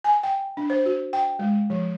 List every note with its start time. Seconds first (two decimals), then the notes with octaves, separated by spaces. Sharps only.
0.04 G#5
0.23 G5
0.57 D4
0.70 C5
0.86 F#4
1.13 G5
1.39 G#3
1.70 F3